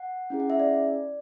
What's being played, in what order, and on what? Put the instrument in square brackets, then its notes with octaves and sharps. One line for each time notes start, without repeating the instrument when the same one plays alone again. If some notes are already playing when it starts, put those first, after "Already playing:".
Already playing: [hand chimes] F#5
C#4 E4 G#4
F#5
E5
D5